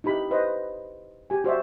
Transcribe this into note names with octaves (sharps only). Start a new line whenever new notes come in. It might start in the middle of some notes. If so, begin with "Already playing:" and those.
D#4 E4 G4 B5
B4 C5 D#5
G4 G#5
F#4 C5 D5 E5